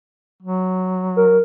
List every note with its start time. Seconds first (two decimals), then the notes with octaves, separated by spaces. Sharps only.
0.43 F#3
1.17 A#4